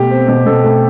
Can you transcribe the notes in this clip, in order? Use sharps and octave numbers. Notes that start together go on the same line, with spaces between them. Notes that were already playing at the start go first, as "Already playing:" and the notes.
Already playing: B2 A3 G4
C4
B2
B2 A4
A3